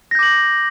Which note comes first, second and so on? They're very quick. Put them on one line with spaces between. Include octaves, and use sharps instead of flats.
A#6 G6 D6 F#7